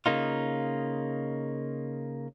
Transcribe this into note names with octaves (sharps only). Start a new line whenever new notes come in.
C#3 A#3 D#4 F4